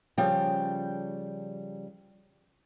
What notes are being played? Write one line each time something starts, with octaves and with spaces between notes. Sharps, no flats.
C#3 F3 G3 G5